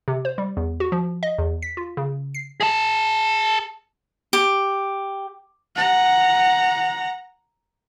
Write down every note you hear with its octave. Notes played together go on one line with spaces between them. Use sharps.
C3
C5
G3
E2
F#4
F3
D#5
E2
B6
F4
C#3
C7
G#4 A5
G4
F#5 A#5